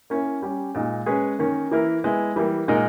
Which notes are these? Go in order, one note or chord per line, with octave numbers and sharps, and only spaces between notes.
A#3 C#4 E4
G3 C#4 G4
A#2 G#3 D#4
G#3 C#4 G#4 B4
D#3 A#3 C#4
E3 A#3 E4 A#4
G#3 B3 E4
E3 G3 A#3
A#2 G#3 D#4 A#4